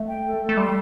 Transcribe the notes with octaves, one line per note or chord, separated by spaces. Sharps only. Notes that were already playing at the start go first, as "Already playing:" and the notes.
Already playing: A3
G5
A4
A4
A3
G3 C6